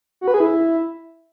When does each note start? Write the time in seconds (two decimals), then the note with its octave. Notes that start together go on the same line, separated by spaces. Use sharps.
0.21 F#4
0.28 B4
0.34 G#4
0.40 E4